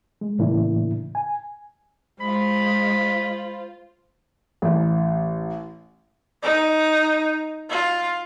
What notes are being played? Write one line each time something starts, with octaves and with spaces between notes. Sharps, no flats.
G#3
A2 C#3 E3 A#3 D4 E4
G#5
G#3 F4 C5 B5
A1
D#4
F4